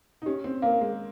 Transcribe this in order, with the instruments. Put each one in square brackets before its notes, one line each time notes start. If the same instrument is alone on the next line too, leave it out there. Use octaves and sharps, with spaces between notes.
[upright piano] D#4
[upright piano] C#4 [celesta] G4
[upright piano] C4
[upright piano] A#3 [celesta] A#4 F5
[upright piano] G#3